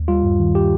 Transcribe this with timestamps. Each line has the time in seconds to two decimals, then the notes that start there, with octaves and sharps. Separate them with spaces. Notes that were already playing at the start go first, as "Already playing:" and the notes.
Already playing: D#2
0.08 G3 F4
0.23 G2
0.40 D#3
0.55 G4